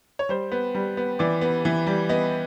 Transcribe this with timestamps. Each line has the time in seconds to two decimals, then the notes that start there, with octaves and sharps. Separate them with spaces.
0.19 C#5
0.29 G3 C5
0.52 B3
0.75 G3
0.97 B3
1.19 E3 D5
1.41 B3
1.65 E3
1.87 G3
2.09 B3 D#5